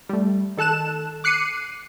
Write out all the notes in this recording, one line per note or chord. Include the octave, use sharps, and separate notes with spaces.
G3 A3
D#3 A4 A5 F#6 E7
D6 F#6 C7 C#7 D#7